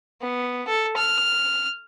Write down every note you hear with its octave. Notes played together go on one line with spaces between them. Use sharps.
B3
A4
F6